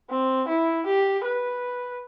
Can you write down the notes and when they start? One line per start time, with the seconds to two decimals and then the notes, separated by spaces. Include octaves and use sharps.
0.10 C4
0.48 E4
0.86 G4
1.25 B4